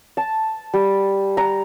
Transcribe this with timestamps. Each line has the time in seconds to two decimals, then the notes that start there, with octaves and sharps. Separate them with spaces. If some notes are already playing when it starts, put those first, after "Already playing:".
0.17 A5
0.74 G3
1.37 A#5